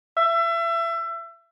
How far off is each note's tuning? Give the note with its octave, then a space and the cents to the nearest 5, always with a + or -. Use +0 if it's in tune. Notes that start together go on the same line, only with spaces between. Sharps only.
E5 +30